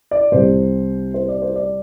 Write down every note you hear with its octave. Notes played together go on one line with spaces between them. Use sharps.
D5
C2 C3 G3 C5
C5
D5
C5
D5